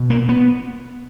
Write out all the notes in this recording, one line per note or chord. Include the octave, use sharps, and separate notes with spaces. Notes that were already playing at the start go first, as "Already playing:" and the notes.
Already playing: B2
A#3
B3